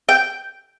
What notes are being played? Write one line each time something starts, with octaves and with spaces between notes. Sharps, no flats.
G5